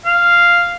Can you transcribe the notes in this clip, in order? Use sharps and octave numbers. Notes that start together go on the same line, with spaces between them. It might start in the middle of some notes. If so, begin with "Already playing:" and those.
F5